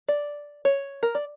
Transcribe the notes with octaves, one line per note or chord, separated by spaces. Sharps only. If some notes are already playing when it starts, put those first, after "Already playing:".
D5
C#5
A#4
D5